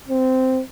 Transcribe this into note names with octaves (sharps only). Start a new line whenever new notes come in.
C4